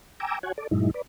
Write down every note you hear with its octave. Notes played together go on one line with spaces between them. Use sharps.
G5 G#5 A#5 D6 E6
F#4 C#5 F#5 G#5
A4 D5
G2 A#2 F#3 G#3 D#4 E4
B4 D5